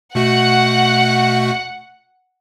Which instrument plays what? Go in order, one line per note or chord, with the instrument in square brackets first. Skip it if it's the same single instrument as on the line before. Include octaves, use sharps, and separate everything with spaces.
[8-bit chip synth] B2 A3 F#4 [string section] F#5